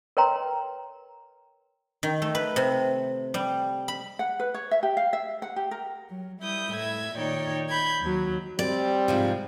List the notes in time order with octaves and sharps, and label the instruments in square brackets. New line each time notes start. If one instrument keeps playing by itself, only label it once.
[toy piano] A#4 B4 C#5 G5 A#5 C6
[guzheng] D#3
A3
B4
C3
G3
B5
[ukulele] F#5
B4
C#5
E5
G4
F5
E5
F#5
G4
A#4
[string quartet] F#3
G3 E4 D#6 G6
A2 E5 G#6
A#2 D#3 D#4 C#5 D5 G5
B5 G6 G#6
D#2 F#3
[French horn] G3 [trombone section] C4 [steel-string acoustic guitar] D5
[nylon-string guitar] G#2 C3 F3